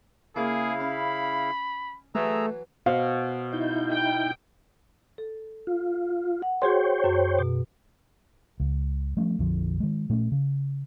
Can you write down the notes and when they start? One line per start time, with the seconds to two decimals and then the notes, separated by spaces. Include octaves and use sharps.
0.36 C#3 A#3 E4 G#4 F5 D6
0.80 C#4 B5
2.15 E3 F#3 A3 G#4 A#5 E6
2.86 B2 C5 F5
3.52 D#4 E4 G6
3.92 G5
5.18 A4
5.67 F4
6.42 F#5
6.62 F#4 G#4 C5 C#5 G5 C6
7.04 F#2 F#4
7.38 B2
8.60 C#2
9.17 F3 G3 A3 C#4
9.39 A#1 F2 D3 F3
9.80 D#3 G#3
10.09 A#2 A3 C4 C#4
10.32 C#3